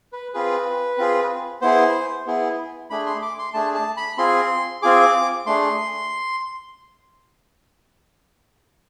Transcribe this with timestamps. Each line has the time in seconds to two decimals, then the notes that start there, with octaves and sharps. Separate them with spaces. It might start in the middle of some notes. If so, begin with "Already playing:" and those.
0.13 B4
0.34 C4 F4 G#4 B4
0.98 C4 F4 G#4
1.61 B3 E4 G#4 C5
2.26 B3 E4 G#4
2.90 A3 D4 G#4 B5
3.06 C6
3.22 D6
3.39 C6
3.54 A3 D4 G#4 A5
3.75 A5
3.97 B5
4.18 C4 F4 G#4 C6
4.82 C4 F4 G#4 D6
5.46 A3 D4 G#4 C6